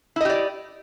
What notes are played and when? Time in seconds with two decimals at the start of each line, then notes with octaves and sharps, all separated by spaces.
0.16 E4
0.21 D#5
0.25 G4
0.30 D5